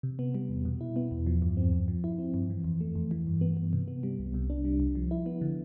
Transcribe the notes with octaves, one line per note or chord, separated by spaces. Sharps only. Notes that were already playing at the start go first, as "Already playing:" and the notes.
C3
B3
G3
E2
B2
E4
B3
E2
F3
G2
C4
G2
F3
E4
C4
G2
E3
F2
A3
F2
E3
G2
B3
G2
C3
B3
G3
C2
C3
D4
G3
C2
F3
E4
B3
D3